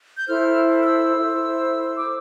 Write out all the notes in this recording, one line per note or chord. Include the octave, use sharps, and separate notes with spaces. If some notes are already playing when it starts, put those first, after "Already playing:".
G6
E4 A4 C5 F6
F6
E6
E4 A4 C5
D6